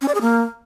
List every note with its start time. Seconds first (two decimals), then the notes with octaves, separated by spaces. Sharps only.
0.02 C#4
0.08 D5
0.15 G#4
0.21 A#3